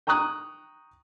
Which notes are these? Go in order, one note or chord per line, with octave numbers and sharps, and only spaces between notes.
G5 A#5 C#6 D#6 F#6